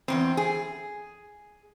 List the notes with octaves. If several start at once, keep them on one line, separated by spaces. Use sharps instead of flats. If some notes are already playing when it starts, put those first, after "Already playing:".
E2 G#2 C4
G#4